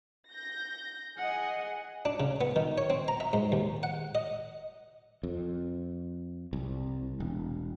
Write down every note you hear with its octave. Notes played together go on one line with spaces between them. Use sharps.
G6 A#6
G#4 D#5 F#5
D4
C#3
B3
D#3
C#5
C4
A#5
E5
G#2
D#2
F#5
D#5
F2
C2
E1